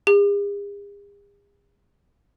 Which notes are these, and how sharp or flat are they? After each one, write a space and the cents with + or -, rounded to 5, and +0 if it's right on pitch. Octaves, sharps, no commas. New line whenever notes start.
G#4 -45